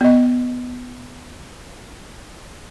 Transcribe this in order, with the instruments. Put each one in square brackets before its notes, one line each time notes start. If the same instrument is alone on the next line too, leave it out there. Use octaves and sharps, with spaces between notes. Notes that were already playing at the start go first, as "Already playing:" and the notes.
[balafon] B3 D#5